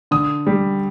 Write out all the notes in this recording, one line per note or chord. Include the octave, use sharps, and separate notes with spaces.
D3 D#6
G3